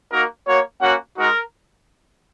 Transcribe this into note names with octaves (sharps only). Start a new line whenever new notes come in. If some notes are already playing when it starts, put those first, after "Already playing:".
A#3 D#4 F#4 A#4
A#3 F#4 C#5
A#3 C#4 F#4 F#5
G#3 D#4 F#4 A#4